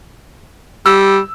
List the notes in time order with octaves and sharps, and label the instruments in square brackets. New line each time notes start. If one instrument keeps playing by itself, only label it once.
[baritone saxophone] G3 [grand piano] E6